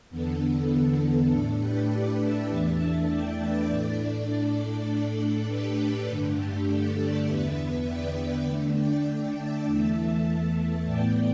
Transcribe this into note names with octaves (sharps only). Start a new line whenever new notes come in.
E2 D3 B3 A4
A2 A3 D4 A4
G4 B4
A4 D5
B4 E5
E2 E3 A3 D4 E5 A5
D5 G5
B4 E5
A2 A3 D4 A4 D5
A2 A3 D4
G4 B4
G2 D3 A3 D4
G4
A4
A4 D5
E2 D3 B3 B4 E5
D5 G5
B4 E5
D3 A3 D4
D5 G5
E5 A5
E2 E3 A3
A2 E3 B3 D5 G5